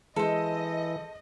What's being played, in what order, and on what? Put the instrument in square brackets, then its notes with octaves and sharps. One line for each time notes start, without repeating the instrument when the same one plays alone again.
[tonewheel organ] E3 [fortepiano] G#3 [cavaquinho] A4 C5 [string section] D#5